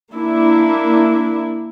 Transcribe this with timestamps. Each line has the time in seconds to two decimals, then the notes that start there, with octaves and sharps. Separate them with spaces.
0.14 A#3 D4 E4